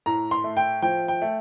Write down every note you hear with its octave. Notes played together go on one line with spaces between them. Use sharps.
A2 A#5
C6
A3
G5
F3 G5
G5
A3